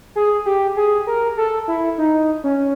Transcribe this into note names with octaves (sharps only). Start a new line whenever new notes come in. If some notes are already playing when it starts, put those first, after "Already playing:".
G#4
G4
G#4
A#4
A4
E4
D#4
C#4